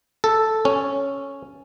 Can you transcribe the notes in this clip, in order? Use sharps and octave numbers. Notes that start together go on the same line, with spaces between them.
A4
C#4